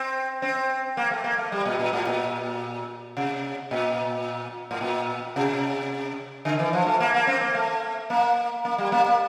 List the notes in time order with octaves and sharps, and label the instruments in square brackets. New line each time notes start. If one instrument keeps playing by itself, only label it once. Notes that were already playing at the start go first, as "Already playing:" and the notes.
Already playing: [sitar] C4
C4
A#3
A3
A#3
A3
G3
A#2
A#2
A2
A#2
C3
A#2
A2
A#2
C3
D3
E3
F3
A3
A#3
A#3
C4
A#3
A3
A#3
A#3
G3
A#3
A#3